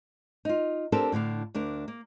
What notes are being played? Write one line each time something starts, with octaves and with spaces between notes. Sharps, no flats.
D#4 F4
C4 D4 G4 A4 A#4 C5
A2 D3 D4 F5
D2 D4 A#4
A#3